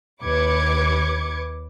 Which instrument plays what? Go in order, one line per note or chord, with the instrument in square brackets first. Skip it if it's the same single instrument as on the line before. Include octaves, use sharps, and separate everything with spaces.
[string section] D#2 B4 D6 G#6 C#7